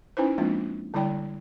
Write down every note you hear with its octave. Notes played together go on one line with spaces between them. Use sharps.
C#4 D#4 E4 B4 C5
F3 G#3 A#3 C4 D4 F4
D3 G3 E4 D5 G5